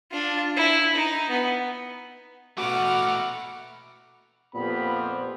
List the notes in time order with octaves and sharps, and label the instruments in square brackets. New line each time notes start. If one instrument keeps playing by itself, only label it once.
[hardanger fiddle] D4 F4
E4
D#4
B3
[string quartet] B2 F#5 F6 [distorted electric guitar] A3 B4 [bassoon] F#4 [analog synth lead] D6
[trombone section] F2 B3 G4 [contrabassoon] A#2 [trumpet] B5
[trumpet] C5